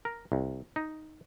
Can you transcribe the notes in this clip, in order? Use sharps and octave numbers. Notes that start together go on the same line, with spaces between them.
A#4
C2
D#4